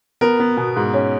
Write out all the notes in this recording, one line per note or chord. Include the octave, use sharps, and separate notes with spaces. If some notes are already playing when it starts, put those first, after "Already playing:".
B3 A#4
B3
B2
G#2
C#4